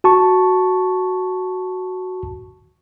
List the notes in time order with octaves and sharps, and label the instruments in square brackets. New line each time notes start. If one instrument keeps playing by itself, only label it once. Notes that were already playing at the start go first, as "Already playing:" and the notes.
[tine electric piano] F#4 A5 C#6